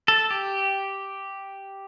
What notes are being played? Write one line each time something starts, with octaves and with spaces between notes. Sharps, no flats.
A4
G4